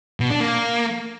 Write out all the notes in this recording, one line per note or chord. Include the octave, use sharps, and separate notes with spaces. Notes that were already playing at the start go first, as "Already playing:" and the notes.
B2
D4
A#3